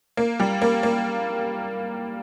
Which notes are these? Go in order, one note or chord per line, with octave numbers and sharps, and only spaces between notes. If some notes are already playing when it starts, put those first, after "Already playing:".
A#3
G3
A#3
A#3